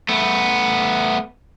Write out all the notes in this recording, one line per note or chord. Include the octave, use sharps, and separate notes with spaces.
A3 B3